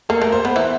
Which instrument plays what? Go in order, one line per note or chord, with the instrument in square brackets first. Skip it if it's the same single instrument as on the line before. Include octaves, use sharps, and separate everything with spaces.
[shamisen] A#3 [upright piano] A4
[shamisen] A3 [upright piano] A#4
[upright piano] C5
[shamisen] B3 [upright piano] B4
[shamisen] E3 E4